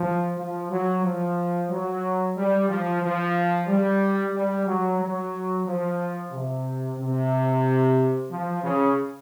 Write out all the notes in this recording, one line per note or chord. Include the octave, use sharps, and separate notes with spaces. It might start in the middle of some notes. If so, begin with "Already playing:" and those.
Already playing: F3
F3
F#3
F3
F#3
G3
F3
F3
G3
G3
F#3
F#3
F3
C3
C3
F3
C#3